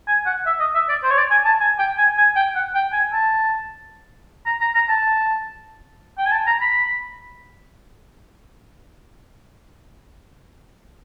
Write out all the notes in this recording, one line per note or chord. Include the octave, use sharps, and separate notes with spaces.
G#5
F#5
E5
D#5
E5
D5
C5
C#5
D5
G#5
A5
G#5
G5
G#5
G#5
G5
F#5
G5
G#5
A5
A#5
A#5
A#5
A5
G5
G#5
A5
A#5
B5